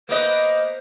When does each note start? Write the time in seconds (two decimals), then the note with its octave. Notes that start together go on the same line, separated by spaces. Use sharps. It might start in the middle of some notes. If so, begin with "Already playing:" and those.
0.09 A#3 B3 C5 D#5